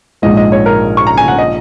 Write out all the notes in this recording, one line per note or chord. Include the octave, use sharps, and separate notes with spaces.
A#1 G#2 G#3 D#5
D#5
C#5
A#4
C#6
A#5
G#5
F#5
D#5